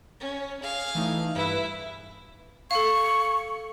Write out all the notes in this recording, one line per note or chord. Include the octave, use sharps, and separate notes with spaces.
C#4
G#4 F5
E3 A3 D#4
G2 E4 B4 E5
A4 F5 C#6